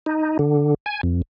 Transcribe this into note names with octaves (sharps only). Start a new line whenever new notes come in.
D#4
D3
G#5
F2